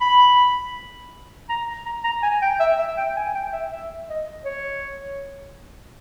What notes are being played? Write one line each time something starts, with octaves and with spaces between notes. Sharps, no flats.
B5
A#5
A#5
A#5
G#5
G5
E5
E5
G5
G#5
G5
E5
E5
D#5
C#5